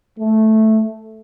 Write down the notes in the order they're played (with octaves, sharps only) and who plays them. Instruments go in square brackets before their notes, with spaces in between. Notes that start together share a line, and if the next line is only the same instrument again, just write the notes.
[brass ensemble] A3